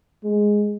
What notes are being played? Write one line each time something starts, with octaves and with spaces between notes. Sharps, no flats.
G#3